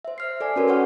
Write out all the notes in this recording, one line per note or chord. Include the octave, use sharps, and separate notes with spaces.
C5 E5
F6 C7
A4 D5 G#5
C#4 F#4 A#4 B4 C#5
A#4 C#5 F#5 G5 C#6 F6